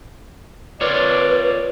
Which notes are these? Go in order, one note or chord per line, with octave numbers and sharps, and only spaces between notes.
F4 A#4 B4 C#5 D5